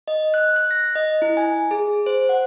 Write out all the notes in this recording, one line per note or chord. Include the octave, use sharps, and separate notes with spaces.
D#5
F#6
F#6
A#6
D#5
E4
G#5
G#4
C5
F#5